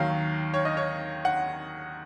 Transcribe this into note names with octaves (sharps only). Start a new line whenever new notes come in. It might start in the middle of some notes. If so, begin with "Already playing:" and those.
Already playing: D#2 D#3 F#3 F5
C#5
D#5
C#5
F#5